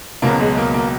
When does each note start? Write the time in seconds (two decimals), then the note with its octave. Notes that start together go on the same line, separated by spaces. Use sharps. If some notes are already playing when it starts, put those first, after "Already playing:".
0.22 C#2 B2 F#3 A#3
0.40 G#3
0.57 A#3
0.74 A#3